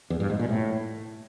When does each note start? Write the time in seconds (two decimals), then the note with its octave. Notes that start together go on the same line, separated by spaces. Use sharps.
0.10 E2
0.20 G2
0.30 G#2
0.39 A#2
0.49 A2